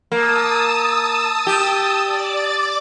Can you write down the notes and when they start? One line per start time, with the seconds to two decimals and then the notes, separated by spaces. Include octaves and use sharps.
0.12 A#3 A5 D#6 E6
1.47 G4
2.04 D5 D6 A6